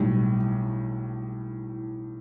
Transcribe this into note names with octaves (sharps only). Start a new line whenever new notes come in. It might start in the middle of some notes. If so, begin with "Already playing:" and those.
Already playing: B1 A2 G3